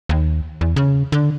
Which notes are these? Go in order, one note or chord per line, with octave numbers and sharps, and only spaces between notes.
D#2
E2
C#3
D3